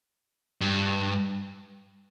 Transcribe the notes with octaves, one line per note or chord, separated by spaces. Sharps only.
G2